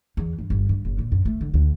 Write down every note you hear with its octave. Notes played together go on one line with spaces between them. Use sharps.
E2
G2
G1
G2
F#1
A#2
F#2
A3
D3
D2